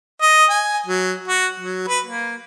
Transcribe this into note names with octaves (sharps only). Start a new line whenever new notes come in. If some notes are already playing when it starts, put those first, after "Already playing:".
D#5
G#5
F#3
F#4
F#3
B4
A#3